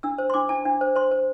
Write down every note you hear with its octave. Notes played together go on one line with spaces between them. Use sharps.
D4 E6
C5
C6
D4 D6
D4 A5
D4
C5
C5 C6
C5